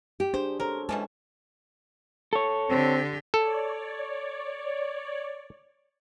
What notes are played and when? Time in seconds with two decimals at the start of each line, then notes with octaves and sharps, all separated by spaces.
0.20 G4
0.34 D4 G#4 C5
0.60 A4 A#4 C5 C#5
0.89 B2 E3 G#3 C#4 A5
2.33 A4 C#5
2.70 D3 C4 G4
3.34 A4 C#5 D5